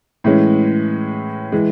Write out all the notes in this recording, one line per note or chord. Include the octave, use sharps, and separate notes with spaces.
A2 E3 G#3 C#4
E3 G#3